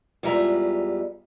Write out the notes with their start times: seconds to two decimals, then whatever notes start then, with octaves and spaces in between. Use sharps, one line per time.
0.23 E2 G3 G#3 F4 E5 A#5